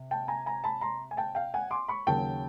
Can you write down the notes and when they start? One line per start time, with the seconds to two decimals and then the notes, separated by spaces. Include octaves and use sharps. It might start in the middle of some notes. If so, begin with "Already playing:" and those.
Already playing: C3
0.11 G5 A5
0.28 G#5 A#5
0.46 G#5 A#5
0.64 A5 B5
0.81 A#5 C6
1.11 G#5
1.17 G5 A5
1.35 F5 G5
1.54 F#5 G#5
1.71 C6 D6
1.88 B5 C#6
2.07 D#2 C#3 F#3 G5 A5